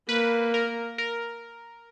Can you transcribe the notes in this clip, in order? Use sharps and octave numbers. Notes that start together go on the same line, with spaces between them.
A#3 B4
A#4
A#4